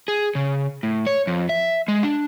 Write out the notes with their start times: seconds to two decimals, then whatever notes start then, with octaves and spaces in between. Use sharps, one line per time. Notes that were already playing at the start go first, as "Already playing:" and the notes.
0.08 G#4
0.35 C#3
0.83 A2
1.07 C#5
1.27 F2
1.49 E5
1.88 G#3
2.03 D4